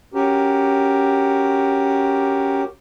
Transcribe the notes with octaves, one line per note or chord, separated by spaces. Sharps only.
C#4 F#4 G4 A#4